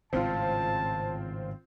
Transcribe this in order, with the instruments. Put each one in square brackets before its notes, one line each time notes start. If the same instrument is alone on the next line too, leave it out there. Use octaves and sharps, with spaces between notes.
[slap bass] G#1 A2 C#3 [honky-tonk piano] C4 F4 [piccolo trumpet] A5